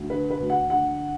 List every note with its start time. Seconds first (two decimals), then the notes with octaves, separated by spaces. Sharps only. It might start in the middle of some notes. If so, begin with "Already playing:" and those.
Already playing: D2
0.10 D3 B4
0.30 B4
0.40 D2
0.50 F#5
0.70 D3 F#5